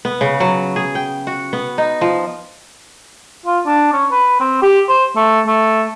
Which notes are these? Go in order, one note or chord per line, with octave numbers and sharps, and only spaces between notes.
B3
C#3
F#3
G#4
G5
F#4
B3
D#4
F3
F4
D4
C#4
B4
C4
G4
C5
A3
A3